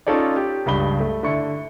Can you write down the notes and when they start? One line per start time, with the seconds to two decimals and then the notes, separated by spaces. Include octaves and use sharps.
0.07 C#4 D#4 F4 A4 C#5 D5
0.36 G4
0.66 C#2 G2 B5 G7
1.00 A3
1.23 D3 E4 A5 C#6 C#7